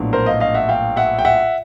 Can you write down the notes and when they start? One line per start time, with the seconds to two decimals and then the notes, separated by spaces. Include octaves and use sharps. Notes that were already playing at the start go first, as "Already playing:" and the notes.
Already playing: A#1 A2 F#3 B3 D4
0.13 A#4 C5
0.26 D#5 F5
0.40 D#5 F5
0.54 E5 F#5
0.69 F5 G5
0.96 E5 F#5
1.19 G5
1.25 E5 F#5